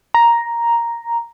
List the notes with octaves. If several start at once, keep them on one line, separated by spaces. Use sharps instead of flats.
A#5